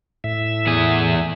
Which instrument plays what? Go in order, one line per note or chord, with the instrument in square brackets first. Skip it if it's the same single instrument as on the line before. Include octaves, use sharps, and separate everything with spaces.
[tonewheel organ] A2 E5
[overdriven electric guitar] E2 G#4